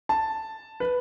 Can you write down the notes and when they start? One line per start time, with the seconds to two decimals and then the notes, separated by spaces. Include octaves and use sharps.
0.09 A5
0.80 B4